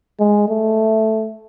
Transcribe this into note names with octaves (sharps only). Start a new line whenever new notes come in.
G#3
A3